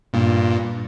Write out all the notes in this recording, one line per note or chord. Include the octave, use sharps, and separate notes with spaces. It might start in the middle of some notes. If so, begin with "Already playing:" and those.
G2 A#2